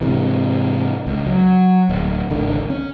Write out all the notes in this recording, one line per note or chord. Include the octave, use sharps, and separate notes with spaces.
G#2 C3 E3
C#2
F#3
D1
G#1 C#2 D3 D#3
C#4